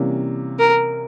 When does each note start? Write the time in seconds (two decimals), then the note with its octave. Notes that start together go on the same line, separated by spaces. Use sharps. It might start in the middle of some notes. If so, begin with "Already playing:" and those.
Already playing: C3 E3 G3 A#3 C#4
0.59 A#4